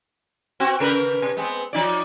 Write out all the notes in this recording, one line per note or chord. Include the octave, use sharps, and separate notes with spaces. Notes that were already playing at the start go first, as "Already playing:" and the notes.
C4 F#4
C#3 A#4 B4
C3
G#3 B3 C4
F3 D#4 D5